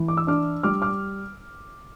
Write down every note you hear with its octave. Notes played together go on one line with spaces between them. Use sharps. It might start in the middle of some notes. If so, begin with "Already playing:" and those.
Already playing: E3
D6
E6
D4 D6 F6
G3 D6 F6
D6 F6